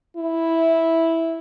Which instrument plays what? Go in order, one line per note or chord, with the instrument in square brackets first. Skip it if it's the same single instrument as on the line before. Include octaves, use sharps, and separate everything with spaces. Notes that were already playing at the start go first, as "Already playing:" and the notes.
[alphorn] E4